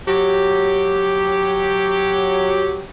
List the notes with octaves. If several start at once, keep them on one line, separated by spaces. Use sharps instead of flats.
F#3 G4